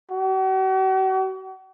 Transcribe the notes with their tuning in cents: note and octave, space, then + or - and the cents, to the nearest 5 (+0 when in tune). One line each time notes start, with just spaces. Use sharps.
F#4 +45